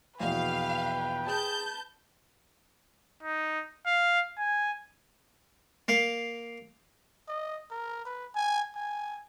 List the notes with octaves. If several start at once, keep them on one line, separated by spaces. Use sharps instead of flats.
A#1 E2 B2 B4 F5 G5
G#4 A5 G6
D#4
F5
G#5
A#3 F5
D#5
A#4
B4
G#5
G#5